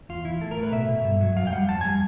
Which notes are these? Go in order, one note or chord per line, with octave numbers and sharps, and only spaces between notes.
E2 F4
E3 E4
A2 A4
A#4
A3
B4
B2 E5
B2
G2
F#3
F#2 F5
G5
G3 F#5
F2 A5
G3 G#5